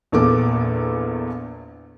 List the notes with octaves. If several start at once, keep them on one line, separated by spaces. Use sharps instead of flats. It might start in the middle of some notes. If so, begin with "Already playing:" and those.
A#1 E2 A#3 A4 D6